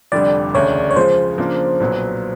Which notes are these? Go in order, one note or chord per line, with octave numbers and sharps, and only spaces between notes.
F1 F2 D3 G3 D5
E1 D2 C#3 C#5
C#5
C#3 F3 G#3 C5
C#3 F3 A#3 D4
B1 A#2 F#3 B3